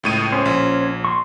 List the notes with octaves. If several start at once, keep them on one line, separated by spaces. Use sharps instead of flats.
C#2 A2 D#7
C#4 C5
A#1
C6 C#6